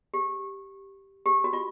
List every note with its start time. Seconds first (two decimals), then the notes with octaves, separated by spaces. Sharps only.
0.14 G4
1.26 G4
1.44 F#4
1.53 F4